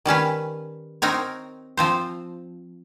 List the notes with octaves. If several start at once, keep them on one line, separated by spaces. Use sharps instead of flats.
D#3 G3 C#4 B4
C4 D#4 A#4 C#5
F3 C4 C5